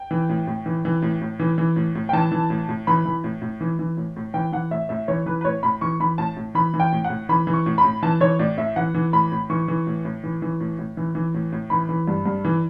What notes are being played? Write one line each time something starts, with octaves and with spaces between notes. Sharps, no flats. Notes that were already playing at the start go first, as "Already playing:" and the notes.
Already playing: G5
E3
A2
A2
E3
E3
A2
A2
E3
E3
A2
A2
G5
E3 A5
E3
A2
A2
E3 B5
E3
A2
A2
E3
E3
A2
A2
E3 G5
E3 F#5
A2 E5
A2 E5
E3 C#5
E3 B4
B4
A2 C#5
A2 B5
E3 C#6
E3 B5
A2 A5
A2
E3 B5
E3
G5
A2
F#5
A2
E3 B5
E3
C#6
A2
B5
A2
E3 A5
E3 C#5
A2 D5
A2 E5
E3 F#5
E3
A2 B5
A2
E3 C#6
E3
A2
A2
E3
E3
A2
A2
E3
E3
A2
A2
E3 B5
E3
G2
G2
E3